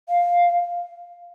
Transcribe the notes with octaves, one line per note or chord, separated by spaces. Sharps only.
F5